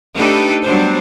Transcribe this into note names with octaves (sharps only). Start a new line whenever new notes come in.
A3 D4 D#4 G4 A4 B4
F#3 G3 B3 D4 C5